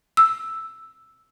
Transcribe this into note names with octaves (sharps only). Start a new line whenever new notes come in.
E6